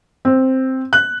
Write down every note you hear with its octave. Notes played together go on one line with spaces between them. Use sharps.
C4
F#6